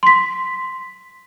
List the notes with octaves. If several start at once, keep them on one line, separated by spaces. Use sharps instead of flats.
C6 B6